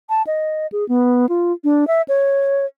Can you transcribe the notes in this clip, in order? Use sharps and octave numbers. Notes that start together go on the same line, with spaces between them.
A5
D#5
G#4
B3
F4
D4
E5
C#5